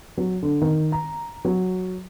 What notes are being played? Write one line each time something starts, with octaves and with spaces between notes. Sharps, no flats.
F#3
D3
D#3
A#5
F#3